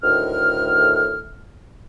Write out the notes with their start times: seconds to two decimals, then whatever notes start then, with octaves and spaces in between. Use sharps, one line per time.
0.03 D2 A2 D#3 F6